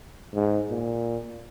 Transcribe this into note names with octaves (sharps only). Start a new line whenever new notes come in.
G#2
A#2